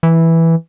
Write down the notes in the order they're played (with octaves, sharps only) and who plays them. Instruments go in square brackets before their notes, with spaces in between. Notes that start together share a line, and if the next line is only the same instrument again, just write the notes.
[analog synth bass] E3